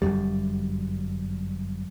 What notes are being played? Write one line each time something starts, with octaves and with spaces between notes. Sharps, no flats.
G1 C2 F#2 G3